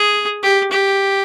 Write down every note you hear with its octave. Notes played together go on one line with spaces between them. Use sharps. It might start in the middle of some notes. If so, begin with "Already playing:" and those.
Already playing: G#4
G4
G4